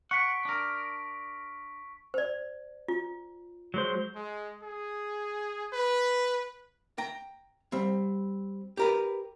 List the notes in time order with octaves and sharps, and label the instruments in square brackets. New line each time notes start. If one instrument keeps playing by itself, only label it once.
[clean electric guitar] F#5 [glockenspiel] C#6 B6 D7
[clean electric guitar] D4 A#4
[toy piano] C5 D5
F4
[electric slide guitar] F#3 G#3 C5
[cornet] G#3
G#4
B4
[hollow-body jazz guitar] G5 A#5
G3 C4
G4 A#4 B4